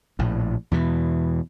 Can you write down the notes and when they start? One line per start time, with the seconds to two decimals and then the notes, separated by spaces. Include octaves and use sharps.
0.19 A#1 A2
0.71 E2 B2 E3